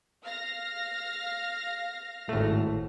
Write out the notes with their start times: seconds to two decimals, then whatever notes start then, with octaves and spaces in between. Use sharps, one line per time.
0.23 F5 F6 A#6
2.29 G#1 A2 A3